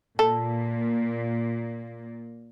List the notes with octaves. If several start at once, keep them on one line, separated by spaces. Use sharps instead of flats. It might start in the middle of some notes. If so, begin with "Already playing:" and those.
A#2 A#3 A4